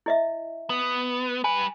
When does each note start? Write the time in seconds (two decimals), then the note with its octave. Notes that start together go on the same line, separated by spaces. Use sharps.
0.06 E4 D#5 E5
0.70 B3
1.44 G3 B4 G#5